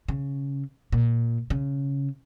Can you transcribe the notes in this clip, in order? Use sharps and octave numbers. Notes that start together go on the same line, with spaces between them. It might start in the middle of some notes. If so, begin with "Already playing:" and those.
C#3
A#2
C#3